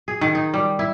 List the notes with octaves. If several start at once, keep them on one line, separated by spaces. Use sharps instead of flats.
G#4
D#3
D#4
G3
E4